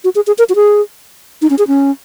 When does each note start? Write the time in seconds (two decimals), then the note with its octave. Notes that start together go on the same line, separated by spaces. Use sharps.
0.04 F#4
0.15 G#4
0.27 G#4
0.38 A#4
0.49 F#4
0.55 G#4
1.42 D#4
1.50 C#4
1.58 G#4
1.68 C#4